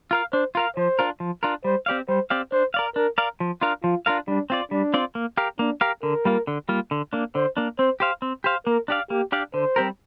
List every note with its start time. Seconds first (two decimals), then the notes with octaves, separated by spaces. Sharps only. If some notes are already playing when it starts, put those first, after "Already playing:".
0.11 F4 A#4 F5
0.33 D4 C5
0.55 F4 A#4 F5
0.76 F3 C5
0.99 D4 F4 A#4
1.20 F3
1.43 D4 F4 A#4
1.64 G3 C5
1.86 C4 G4 D5 F5
2.08 G3 C5
2.30 C4 G4 D5 F5
2.52 D4 C5
2.74 A#4 D5 F5
2.95 D4 A#4
3.18 A#4 D5 F5
3.40 F3
3.61 D4 F4 A#4 F5
3.84 F3 F4
4.06 D4 F4 A#4 F5
4.28 G3 D4
4.50 C4 F4 D5
4.71 G3 D4
4.94 C4 F4 D5
5.15 A#3
5.37 G4 A#4 F5
5.59 A#3 D4
5.81 G4 A#4 F5
6.03 D3 A#4
6.25 G3 A#3 F4
6.47 D3
6.69 G3 A#3 F4
6.91 D3
7.13 A#3 D4
7.35 D3 C5
7.57 A#3 D4
7.79 C4 C5
8.00 G4 C5 F5
8.22 C4
8.44 G4 C5 F5
8.66 A#3 A#4
8.88 D4 G4 D5 F5
9.10 A#3 G4
9.32 D4 G4 D5 F5
9.54 D3 C5
9.76 G3 C4 G4 A#4